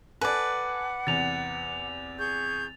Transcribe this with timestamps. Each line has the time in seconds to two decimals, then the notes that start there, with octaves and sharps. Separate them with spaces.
0.21 A4 B4 D5 F#5 G#5
1.07 E2 C3 A6 F7
2.19 G#4 C#6 G6